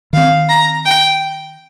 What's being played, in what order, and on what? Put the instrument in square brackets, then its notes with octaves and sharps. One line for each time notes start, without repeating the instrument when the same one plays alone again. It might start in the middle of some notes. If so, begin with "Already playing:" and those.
[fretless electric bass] D#3 C4 [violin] F5
[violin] A#5
G5